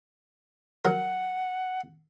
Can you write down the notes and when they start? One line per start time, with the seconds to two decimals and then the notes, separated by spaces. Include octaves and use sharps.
0.85 F#3 A#4 F#5